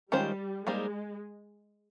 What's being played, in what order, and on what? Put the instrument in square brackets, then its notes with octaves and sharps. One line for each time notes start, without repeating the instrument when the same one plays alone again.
[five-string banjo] D#3 G#3 C#4 F4 C5 [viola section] G3
[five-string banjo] G3 A#3 D#4 G#4 C5 [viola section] G#3